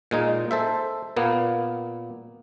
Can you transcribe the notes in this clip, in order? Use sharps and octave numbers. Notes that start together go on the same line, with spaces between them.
A#2 G#3 D#4
A4 C5 E5
A#2 A#3 B3